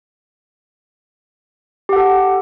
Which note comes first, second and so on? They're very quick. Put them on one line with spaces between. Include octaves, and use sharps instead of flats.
G4 F#5 A4